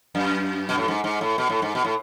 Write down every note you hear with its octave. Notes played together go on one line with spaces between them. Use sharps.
F#2
B2
A2
G#2
G#2
A2
B2
A2
G#2
B2
A2